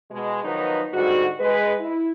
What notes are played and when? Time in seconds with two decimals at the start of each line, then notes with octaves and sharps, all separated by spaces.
0.11 B2 G#3
0.43 D#3 F3 F#3 B3 D#4 B4
0.93 G#2 D3 G3 F#4
1.40 G#3 B4
1.79 E4